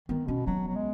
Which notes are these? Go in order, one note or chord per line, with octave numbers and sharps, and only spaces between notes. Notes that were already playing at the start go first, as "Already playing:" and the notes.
D#3 B3
B2 C#4
F#3 B3
F#3
G#3